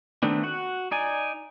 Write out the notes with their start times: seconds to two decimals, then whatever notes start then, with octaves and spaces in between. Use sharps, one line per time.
0.23 D#3 A3 B3 C4 D4
0.43 F#4 F#5
0.91 D#4 D5 G#5